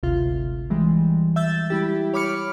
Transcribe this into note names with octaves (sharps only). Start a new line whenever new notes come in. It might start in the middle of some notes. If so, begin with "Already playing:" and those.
G#1 D2 C3 F4
E3 G3 G#3
E5 E6 G6 A6
G3 E4 G4
C#5 B5 D6 F6 C#7